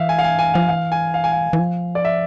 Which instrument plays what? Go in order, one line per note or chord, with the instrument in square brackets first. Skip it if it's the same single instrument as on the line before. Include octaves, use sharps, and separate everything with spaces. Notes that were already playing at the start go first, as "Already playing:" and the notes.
Already playing: [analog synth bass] E3 [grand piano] E5 F5
[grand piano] G#5
F5
G#5
G#5
[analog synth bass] F3 [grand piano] F5
[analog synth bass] E3 [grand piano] F5
[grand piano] G#5
F5
G#5
F5
[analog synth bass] E3
F3
[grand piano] D5
E5